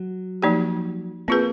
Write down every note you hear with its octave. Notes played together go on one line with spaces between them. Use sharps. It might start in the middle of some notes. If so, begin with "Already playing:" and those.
Already playing: F#3
F3 A#3 D#4 G4
A#3 C4 F4 G#4 B4